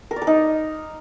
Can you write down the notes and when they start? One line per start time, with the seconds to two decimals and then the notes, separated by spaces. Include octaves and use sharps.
0.11 A#4
0.16 D5
0.22 A#4
0.27 D#4